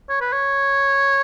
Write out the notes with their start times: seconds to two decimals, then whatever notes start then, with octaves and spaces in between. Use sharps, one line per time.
0.09 C#5
0.21 B4
0.33 C#5